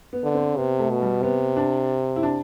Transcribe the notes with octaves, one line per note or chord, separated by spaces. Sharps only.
B3
D3
C4
C3 B3
A3
B2
G3
C3 B3
D4
E4
D4